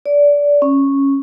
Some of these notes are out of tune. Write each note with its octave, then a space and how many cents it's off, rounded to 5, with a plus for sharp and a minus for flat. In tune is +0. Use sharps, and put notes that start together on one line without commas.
D5 -20
C#4 -10